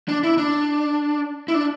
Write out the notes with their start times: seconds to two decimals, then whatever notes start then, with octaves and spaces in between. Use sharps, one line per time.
0.09 D4
0.23 E4
0.38 D4
1.48 E4
1.54 D4